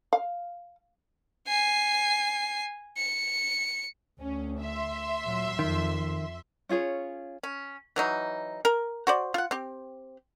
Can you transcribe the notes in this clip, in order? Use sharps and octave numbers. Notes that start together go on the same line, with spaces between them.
F5
G#5 C7
C#7
D2 C#4
E5 C6
A#2 F#3
F2 D#3
C#4 F4 G#4 C#5
C#4
E3 F#3 D#4
A#4
F#4 C5 D5
F4 F#5
C4 G4